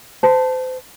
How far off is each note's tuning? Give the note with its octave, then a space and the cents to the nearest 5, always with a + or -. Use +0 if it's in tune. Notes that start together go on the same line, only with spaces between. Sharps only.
C5 -30 A5 +0